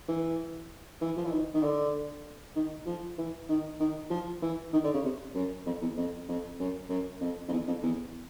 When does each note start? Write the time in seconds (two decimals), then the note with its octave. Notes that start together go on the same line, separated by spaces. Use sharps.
0.08 E3
1.01 E3
1.17 F3
1.25 E3
1.32 D#3
1.54 D#3
1.63 D3
2.56 D#3
2.87 F3
3.18 E3
3.49 D#3
3.80 D#3
4.11 F3
4.42 E3
4.73 D#3
4.84 D3
4.94 C#3
5.04 C3
5.35 F#2
5.66 F2
5.82 E2
5.97 F2
6.28 F2
6.59 F#2
6.89 F#2
7.21 F2
7.48 F2
7.52 E2
7.67 F2
7.82 E2